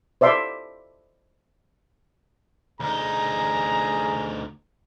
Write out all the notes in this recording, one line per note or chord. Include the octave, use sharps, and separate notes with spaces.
C5 D5 E5 C6 D6
D2 D#4 G#4 A#5